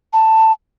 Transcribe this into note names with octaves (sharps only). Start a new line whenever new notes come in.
A5